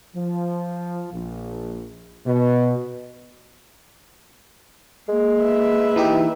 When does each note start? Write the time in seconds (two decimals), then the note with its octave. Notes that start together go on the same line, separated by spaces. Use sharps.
0.16 F3
1.13 A#1
2.26 B2
5.09 G#3 A#3
5.42 B4 E5
5.96 E3 D#4 G4